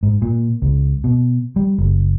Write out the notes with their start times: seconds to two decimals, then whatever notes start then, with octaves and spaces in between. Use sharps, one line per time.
0.03 G#2
0.22 A#2
0.62 C#2
1.04 B2
1.56 G3
1.78 F#1